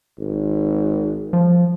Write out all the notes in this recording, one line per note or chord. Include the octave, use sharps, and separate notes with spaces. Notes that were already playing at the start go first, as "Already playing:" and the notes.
G#1
F3